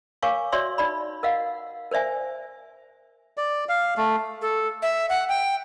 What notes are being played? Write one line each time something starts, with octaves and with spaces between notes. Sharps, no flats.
A#4 C#5 F5 G#5 C#6 D6
F#4 C#5 D5 E5 C6 E6
D#4 D5 B5
A#4 D#5 F5 F#5
A#4 C5 D5 E5 G#5
D5
F5
A3
A4
E5
F#5
G5